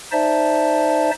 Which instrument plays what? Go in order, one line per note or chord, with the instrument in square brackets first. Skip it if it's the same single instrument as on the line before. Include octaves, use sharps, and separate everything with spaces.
[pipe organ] D#4 C5 D5 E5 A5